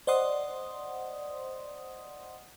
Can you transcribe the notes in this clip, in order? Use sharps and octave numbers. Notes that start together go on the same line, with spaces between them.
C5 D5 D#5 F#5 C6 D#6